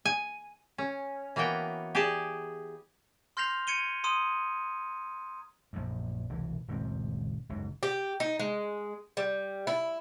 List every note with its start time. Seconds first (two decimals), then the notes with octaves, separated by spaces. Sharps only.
0.05 G#5
0.78 C#4
1.36 E3 A#3 B3 F#4 G5
1.95 G4 G#4 D5 G#5 A5
3.37 C6 F6 G6 A#6 C7 F7
3.67 G#6 C#7 D#7 G7
4.04 A#5 C6 D#6 D#7
5.73 A#1 F#2
6.29 E1 C2 E3
6.68 D#1 C#2 F#2 C4
7.49 F#1 C#2 G#2
7.83 G4
8.20 D#4
8.39 G#3
9.17 G3
9.67 E4